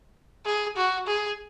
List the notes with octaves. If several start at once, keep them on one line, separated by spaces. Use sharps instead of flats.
G#4
F#4
G#4